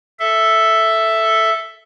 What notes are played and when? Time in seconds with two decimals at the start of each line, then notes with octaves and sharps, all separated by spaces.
0.19 A4 E5